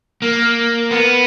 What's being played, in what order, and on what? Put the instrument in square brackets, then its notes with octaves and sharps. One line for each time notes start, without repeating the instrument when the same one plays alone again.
[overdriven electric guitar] A#3
B3